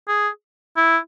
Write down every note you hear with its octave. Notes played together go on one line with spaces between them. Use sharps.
G#4
E4